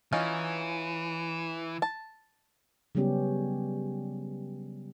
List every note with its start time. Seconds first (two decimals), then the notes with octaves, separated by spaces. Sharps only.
0.13 E3 C#4 D#4 F4
1.82 A5
2.95 C#3 F#3 G3 B3 C#4 G4